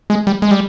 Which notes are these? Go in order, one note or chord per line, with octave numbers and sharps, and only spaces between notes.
G#3
G3
G#3
G3